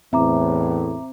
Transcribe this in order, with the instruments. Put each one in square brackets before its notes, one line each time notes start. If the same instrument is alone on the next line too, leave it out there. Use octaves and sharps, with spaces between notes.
[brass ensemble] E2 A2 [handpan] C4 [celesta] E5 A#5 D6